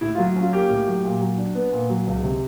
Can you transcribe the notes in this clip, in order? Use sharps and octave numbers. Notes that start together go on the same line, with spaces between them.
A2 E4
F4
F#3
C#4 F4
A#3 G4
A2
F#3
A#2
F#3
D4
B3
A#2
F#3
C#2
C3